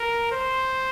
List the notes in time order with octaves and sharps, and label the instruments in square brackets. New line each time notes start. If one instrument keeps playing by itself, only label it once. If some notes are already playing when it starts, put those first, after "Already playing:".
Already playing: [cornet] A#4
C5